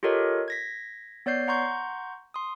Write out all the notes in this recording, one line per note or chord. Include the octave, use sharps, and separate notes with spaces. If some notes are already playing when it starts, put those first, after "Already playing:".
F4 G4 A4 A#4 C#5 D#5
G#6 A#6 B6
B3 C#5 D5 G6 C7
F#5 A#5 C6 C#6 G6
C6 D#6